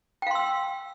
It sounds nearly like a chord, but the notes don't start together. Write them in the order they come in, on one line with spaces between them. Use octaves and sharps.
G5 F5 C6 E6